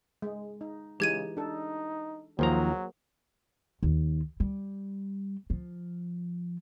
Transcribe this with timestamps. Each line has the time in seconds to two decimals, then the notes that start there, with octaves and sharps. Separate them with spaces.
0.22 G#3
0.61 D#4
1.00 C#3 E3 G#3 D#4 G4 G#6 D#7
1.37 D4 D#4 A4
2.39 D#2 F3 F#3 A#3 G#4 C5 A#5
3.83 D#2
4.40 G3
5.50 F3